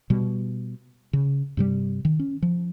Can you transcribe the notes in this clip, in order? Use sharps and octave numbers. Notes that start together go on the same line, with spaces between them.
B2 G3
C#3
G2 C3 G3
D#3
C#4
F3